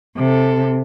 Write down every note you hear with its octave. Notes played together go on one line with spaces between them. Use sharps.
C3 A4